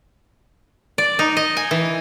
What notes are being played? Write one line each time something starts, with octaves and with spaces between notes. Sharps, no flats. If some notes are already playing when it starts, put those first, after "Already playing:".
D5
D#4
D#5
G#5
E3